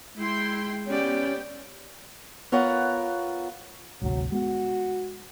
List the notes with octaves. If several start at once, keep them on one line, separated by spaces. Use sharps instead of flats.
G#3 E4 G5 C6
B3 C#4 G4 D5 G5
B3 F4 A#4 C#5 F#5
G#1 D2 C3 F#3
G#3 B3 F#4